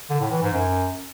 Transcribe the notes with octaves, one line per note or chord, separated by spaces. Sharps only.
D3
A2
E3
G#2
F#2